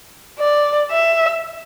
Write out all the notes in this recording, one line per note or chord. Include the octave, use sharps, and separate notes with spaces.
D5
E5